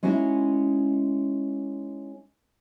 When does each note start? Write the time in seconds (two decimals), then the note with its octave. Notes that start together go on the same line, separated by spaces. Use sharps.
0.03 G#3 C#4 D#4 E4 F#4